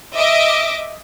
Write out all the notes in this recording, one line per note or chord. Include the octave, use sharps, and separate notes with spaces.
D#5 E5 D6